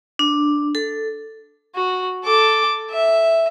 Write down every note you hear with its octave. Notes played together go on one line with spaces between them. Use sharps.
D4
A4
F#4
A4 D6
E5